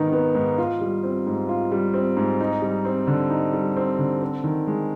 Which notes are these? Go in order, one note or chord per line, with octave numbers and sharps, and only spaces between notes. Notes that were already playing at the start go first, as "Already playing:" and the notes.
Already playing: G#2 D#3 B3 D#4
B3
G#2
F4
G3
C4
G#2
F4
G3
C4
G#2
D#4
G3
C4
D3
D#4
G3
C4
D3
C4
D#3
G#3